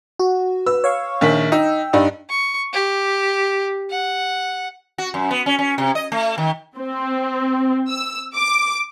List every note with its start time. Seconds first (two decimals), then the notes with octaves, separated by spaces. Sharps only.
0.19 F#4
0.66 B4 E6
0.84 C#5 F5 C#6
1.21 A#1 D#3 B6
1.52 D#4 G5 E6
1.93 G2 D4 D#4
2.29 C#6
2.73 G4
3.91 F#5
4.98 F#4
5.14 F#2
5.31 B3
5.46 C#4
5.59 C#4
5.78 C3
5.95 D#5
6.12 A3
6.38 D#3
6.78 C4
7.89 E6
8.35 D6